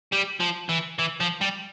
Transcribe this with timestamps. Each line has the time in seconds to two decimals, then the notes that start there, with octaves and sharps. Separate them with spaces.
0.12 G3
0.40 F3
0.69 E3
0.99 E3
1.20 F3
1.41 G3